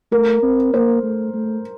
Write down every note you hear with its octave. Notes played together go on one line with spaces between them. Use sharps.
A3 A#4
C4
A#3 C5
A3
A3